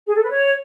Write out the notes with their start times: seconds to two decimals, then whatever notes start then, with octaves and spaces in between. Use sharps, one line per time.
0.07 G#4
0.15 A4
0.22 B4
0.30 C#5